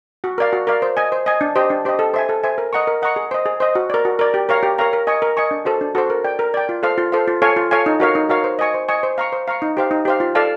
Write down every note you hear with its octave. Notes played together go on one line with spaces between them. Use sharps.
F#4
A#4 D5 F5
F#4
A#4 D5 F5
C5
D#5 G#5
C5
D#5 G#5
D4
G4 C5 D#5
D4
G4 C5 D#5
A4
C5 E5 G#5
A4
C5 E5 G#5
A#4
D#5 F#5 A#5 C#6
A#4
D#5 F#5 A#5 C#6
G#4
C5 D#5
G#4
C5 D#5
F#4
A#4 D5
F#4
A#4 D5
G4
A#4 C#5 F5 A#5
G4
A#4 C#5 F5 A#5
A#4
D#5 G#5 C#6
A#4
D#5 G#5 C#6
D4
F#4 A4 C5
D4
F#4 A4 C5
A#4
D5 G5
A#4
D5 G5
F4
A4 C5 F5
F4
A4 C5 F5
F4
A4 C#5 F5 G#5
F4
A4 C#5 F5 G#5
D#4
F#4 A#4 C#5 F5
D#4
F#4 A#4 C#5 F5
C5
D#5 G#5 C#6
C5
D#5 G#5 C#6
C5
F5 A#5 C#6
C5
F5 A#5 C#6
D#4
G4 C5 F5
D#4
G4 C5 F5
F4
A4 D5 F5 A5